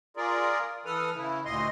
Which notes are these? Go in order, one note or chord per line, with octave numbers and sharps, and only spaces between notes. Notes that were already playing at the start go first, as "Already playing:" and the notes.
F4 G#4 A#4 D5
E3 A4 B4 D#6 F6
C#3 E4
D2 A#2 D#5 C6